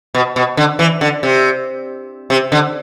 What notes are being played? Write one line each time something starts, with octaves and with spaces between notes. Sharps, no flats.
B2
B2
D3
E3
D3
C3
C3
D3